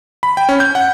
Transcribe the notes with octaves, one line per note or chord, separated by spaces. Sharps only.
B5
G5
C#4
G6
F#5